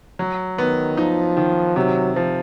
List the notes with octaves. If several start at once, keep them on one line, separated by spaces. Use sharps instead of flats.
F#3
D#3 B3
F3 D#4
D#3
C3 F#3
F3